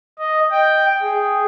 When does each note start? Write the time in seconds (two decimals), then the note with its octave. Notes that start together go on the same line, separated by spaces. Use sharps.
0.19 D#5
0.51 G5
1.02 G#4